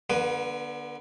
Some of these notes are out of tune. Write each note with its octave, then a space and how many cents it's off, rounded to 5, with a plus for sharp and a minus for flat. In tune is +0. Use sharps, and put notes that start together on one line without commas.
D3 +5 B3 -45 B4 +0